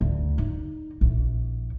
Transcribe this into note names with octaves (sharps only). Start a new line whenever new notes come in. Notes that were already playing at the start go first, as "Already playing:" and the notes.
D2
D#4
A#1 E3